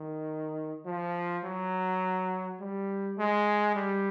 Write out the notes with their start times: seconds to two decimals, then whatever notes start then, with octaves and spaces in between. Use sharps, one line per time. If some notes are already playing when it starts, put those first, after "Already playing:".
Already playing: D#3
0.86 F3
1.44 F#3
2.60 G3
3.18 G#3
3.75 G3